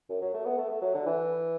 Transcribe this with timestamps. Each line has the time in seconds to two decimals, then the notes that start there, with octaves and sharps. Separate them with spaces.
0.10 F#2
0.22 F#3
0.34 A3
0.46 B3
0.58 A3
0.70 A3
0.82 F#3
0.94 D3
1.06 E3